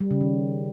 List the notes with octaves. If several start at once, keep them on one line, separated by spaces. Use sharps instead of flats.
G3
C#3
D#3